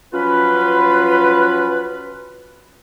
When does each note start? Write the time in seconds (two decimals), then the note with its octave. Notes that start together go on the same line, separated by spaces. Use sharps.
0.13 F3 F#3 C#4 F4 B4